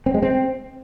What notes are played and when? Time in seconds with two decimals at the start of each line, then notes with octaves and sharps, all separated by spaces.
0.06 C4
0.14 G#3
0.23 C4